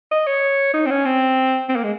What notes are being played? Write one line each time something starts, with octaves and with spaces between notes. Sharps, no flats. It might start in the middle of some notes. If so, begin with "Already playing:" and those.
D#5
C#5
D#4
C4
C#4
C4
C4
A#3
G#3